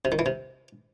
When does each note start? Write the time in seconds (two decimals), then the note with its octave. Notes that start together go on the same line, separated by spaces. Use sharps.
0.05 C3
0.12 D#3
0.19 E3
0.26 C3